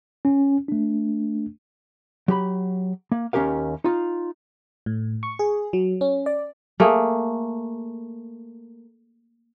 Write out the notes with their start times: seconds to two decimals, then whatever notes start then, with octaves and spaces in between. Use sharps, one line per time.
0.25 C#4
0.68 A3 D4
2.28 F#3 G4 B5
3.12 A#3
3.33 D#2 C#4 G4 A#4 F5
3.84 D#4 F4
4.86 A2
5.23 C#6
5.39 G#4
5.73 F#3
6.01 C#4
6.26 D5
6.80 A3 A#3 G#4